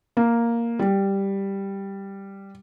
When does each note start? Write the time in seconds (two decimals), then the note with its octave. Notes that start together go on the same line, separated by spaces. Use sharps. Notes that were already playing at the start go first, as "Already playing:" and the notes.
0.17 A#3
0.79 G3